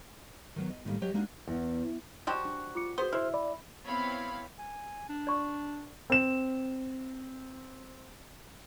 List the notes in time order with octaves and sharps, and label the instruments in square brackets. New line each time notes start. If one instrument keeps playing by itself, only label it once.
[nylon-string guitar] D#3 F#3 B3
D#5
A2 D#3 F#3 G3 A#3
F#3 G4 C#5 D#5
G#3 A#3 D4 D#4 F#4
E2
[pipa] F3 G3 F#4 [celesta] C6 E7
[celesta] D4
F4 D6 C#7
[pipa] B3 C5 [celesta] F#4 G#4 G7
[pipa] E4 [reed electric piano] C5 F6
[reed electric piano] D5 [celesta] B5
[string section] B3 C4 E4 C#5 F5 B5
[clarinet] G#5
D4
[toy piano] D5 C#6
[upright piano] C4 E7